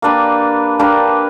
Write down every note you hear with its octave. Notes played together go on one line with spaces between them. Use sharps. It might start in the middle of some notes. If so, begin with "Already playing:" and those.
A#3 D4 G4 B4
A#3 D4 G4 B4